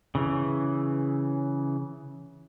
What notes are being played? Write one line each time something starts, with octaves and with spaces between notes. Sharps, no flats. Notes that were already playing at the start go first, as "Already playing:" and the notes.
C#3 E3